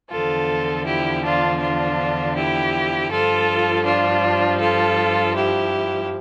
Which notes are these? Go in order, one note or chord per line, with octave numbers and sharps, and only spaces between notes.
E2 D3 F3 F4 A4
E4 G4
D4 F4
D4 F4
E4 G4
G2 F3 F4 A4
D4 F4
F4 A4
E4 G4